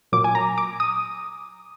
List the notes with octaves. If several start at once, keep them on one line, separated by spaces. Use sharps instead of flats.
A#2 F#3 A#3 D6
G#5
A#5
D6
D#6